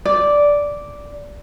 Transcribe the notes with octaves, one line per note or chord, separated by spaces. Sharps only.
D5